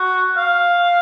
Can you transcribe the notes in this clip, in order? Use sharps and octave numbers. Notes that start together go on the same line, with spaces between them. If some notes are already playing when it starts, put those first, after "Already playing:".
Already playing: F#4
F5